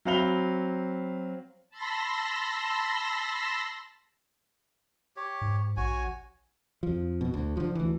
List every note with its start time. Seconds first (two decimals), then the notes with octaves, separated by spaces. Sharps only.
0.05 F#3 C4 F5 B5 F7 G7
1.70 A5 B5 C6 E6 A#6
5.16 G4 C#5
5.41 G#2
5.77 A#1 F#4 C#5 G#5
6.83 F2 F3
7.21 B2
7.34 D2
7.57 D3 F3
7.75 D2 E3